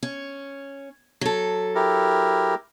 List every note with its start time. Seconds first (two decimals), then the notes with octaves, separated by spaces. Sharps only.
0.03 C#4
1.21 F#3 A4
1.75 E4 G4 A#4